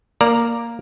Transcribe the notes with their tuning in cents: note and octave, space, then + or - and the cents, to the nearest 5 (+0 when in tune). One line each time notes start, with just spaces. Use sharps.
A#3 +0 D5 +0 A#5 +0